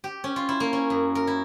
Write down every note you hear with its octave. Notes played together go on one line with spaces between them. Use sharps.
G4
C#4
F4
E4
A#3
C#4
F#2
A#4
E4